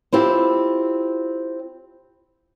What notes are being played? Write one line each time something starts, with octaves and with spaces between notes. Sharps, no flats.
C4 E4 F4 G4